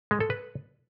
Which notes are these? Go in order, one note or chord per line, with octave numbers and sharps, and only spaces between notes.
G#3
A4
B4